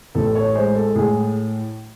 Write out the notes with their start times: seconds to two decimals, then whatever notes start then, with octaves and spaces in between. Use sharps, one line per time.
0.15 A1 A4
0.35 C#5
0.55 G#3 C5
0.75 A4
0.95 A2 G#4